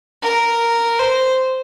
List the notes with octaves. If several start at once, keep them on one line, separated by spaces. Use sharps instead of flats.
A#4
C5